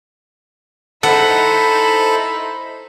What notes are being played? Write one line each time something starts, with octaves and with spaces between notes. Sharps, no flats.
D#4 E4 A4 C5 F#5 B5